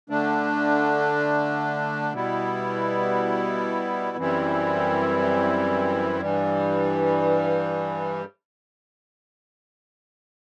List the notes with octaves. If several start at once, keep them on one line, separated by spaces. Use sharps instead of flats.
D3 A3 D4
B2 G3 B3 E4
F#2 E3 G3 C4 E4
G2 E3 G3